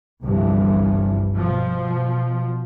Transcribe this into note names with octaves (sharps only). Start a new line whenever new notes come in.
G1 C2 G2 E3 F3
B2 F3